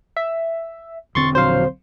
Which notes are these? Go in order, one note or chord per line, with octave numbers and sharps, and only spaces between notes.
E5
E1 D3 C4 C6 C#6 A6
A#1 F#3 C5 F5